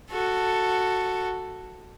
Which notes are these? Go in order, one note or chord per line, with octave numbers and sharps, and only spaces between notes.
F#4 A4